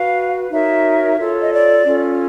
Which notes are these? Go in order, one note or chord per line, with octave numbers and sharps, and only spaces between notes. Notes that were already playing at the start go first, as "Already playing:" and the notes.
Already playing: F#4 B4 F5
D#4 F#4 A#4 C#5 E5
F4 A4 C#5
D#5
D5
C#4 F4 A4